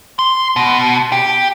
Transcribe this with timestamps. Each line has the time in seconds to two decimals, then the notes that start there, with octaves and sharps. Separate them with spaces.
0.19 C6
0.56 B2
1.12 G4